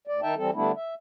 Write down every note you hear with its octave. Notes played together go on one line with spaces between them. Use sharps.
D2 D5
D#3 D#4 E5 G5 A5
E3 G3 C4 A4
D3 G3 A3 B3 D4 E4
E5